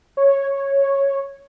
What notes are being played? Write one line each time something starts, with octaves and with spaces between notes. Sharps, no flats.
C#5